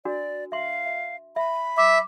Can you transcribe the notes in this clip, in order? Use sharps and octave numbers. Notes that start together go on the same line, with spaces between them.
D4 F#4 A#4 D5
E5 F5 C6
E5
E5 B5
E5 D6